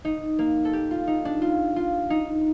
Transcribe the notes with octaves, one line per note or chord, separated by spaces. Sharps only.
D#4
A#3
A4
G4
F4
D#4
D4
F4
F4
D#4